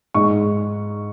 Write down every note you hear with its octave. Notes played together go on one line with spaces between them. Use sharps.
G#2 G#3 C#6